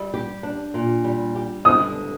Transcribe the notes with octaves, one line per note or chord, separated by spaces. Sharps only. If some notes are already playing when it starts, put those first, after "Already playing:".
Already playing: G3
G4
D4
A#2
G3
G4
D3 D#6